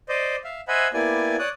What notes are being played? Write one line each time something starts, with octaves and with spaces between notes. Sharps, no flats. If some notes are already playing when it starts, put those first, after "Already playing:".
C5 D5 D#5
E5 F5
C5 D#5 E5 F#5 G#5 B5
A#3 B3 E4 G4 D5 G#5
C#5 D5 D#6 F#6